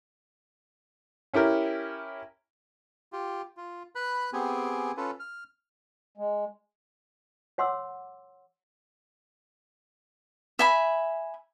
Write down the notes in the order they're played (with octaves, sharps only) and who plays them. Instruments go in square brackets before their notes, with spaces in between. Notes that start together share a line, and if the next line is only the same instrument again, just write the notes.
[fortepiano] C#4 E4 G4 A#4
[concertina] F4 G4
F4
B4 B5 F#6
B3 C4 G4 G#4 G#5
C#4 F4 A4 B4
F6
[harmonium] G#3
[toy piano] C#5 F#5 C6 D6 E6
[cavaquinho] E5 G#5 B5